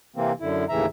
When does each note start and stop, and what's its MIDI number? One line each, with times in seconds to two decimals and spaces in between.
0.16 0.32 48
0.16 0.32 52
0.16 0.32 58
0.16 0.32 60
0.40 0.65 42
0.40 0.65 50
0.40 0.65 64
0.69 0.86 39
0.69 0.86 45
0.69 0.86 49
0.69 0.86 52
0.69 0.86 76
0.69 0.86 82